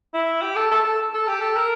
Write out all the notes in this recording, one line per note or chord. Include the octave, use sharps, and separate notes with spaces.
E4
G4
A4
A4
A4
A4
G4
A4
A#4